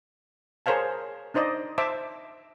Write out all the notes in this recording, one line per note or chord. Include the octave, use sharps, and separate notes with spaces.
G#4 A#4 C5 C#5 F5 A5
D4 D#4 C5 D5 D#5
C5 E5 A5 D6